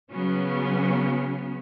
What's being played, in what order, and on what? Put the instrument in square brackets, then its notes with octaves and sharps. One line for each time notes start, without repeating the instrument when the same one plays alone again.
[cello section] C#3 F#3 B3 C#4